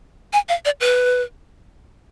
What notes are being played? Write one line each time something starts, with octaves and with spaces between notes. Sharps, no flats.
G#5
F5
D5
B4